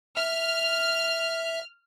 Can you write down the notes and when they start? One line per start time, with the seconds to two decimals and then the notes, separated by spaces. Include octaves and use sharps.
0.17 E5 F6